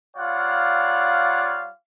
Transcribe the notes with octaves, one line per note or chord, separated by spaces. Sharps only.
G3 F4 C#5 D5 F5 F#5